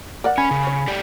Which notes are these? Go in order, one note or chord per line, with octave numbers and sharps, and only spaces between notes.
A#4 D5 F#5
C#4 G#5 B5
C#3
C#5
A3 G4 D5